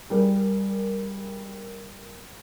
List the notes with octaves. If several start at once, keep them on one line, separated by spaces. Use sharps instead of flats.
G3 G#4 A#4